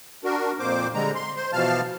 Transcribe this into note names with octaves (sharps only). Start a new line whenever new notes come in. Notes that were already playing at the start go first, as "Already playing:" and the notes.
D4 F#4 A#4
F2 A#2 A#3 C5 D6
D3 G3 G#3 A#5
C6
C5 C6
B2 E3 F3 F5 A5 F6